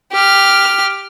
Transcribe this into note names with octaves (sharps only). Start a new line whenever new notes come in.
G4 F6